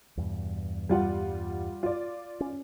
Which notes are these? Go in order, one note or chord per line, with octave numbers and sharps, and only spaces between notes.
E2 G2 B2
G3 F4 F#5
F4 D5
C#4